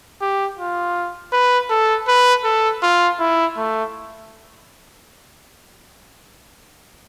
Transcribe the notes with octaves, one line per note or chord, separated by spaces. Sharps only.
G4
F4
B4
A4
B4
A4
F4
E4
A3